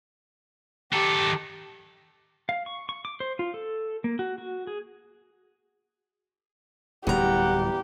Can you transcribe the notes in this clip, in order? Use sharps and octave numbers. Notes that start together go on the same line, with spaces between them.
D#3 G4 A4
F5
C#6
C#6
D6
C5
F4
A4
A#3
F#4
F#4
G#4
D1 E2 G3 G4 F#5 A#5